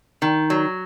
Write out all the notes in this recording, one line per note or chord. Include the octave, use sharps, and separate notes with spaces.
D#3
F#3